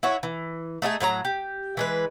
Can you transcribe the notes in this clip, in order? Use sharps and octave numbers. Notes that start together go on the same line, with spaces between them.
E4 F#4 C#5
E3
A3 D#4 F4 G#4
A2 F#3 E4 A#5
G4
E3 G#3 B4